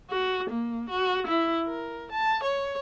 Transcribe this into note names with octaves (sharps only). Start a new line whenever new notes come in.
F#4
A#3
F#4
E4
A#4
A5
C#5